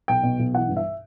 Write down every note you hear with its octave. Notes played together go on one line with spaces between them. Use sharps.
B1 G5
B2
B1
E3 F#5
G2
E5